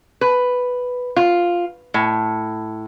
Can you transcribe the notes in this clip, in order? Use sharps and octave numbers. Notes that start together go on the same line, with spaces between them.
B4
F4
A2